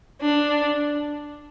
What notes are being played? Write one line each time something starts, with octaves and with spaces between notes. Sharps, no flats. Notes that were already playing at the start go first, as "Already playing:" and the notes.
D4